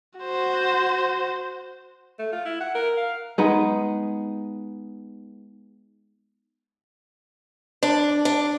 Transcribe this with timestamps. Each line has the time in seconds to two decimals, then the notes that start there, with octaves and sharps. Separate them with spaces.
0.20 F#4 C5
2.19 A3
2.32 F4
2.45 E4
2.61 F#5
2.75 A#4
2.97 F5
3.38 G#3 B3 D#4
7.83 D4
8.25 D4